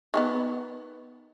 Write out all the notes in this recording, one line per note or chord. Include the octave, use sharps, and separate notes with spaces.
D#3 A3 B3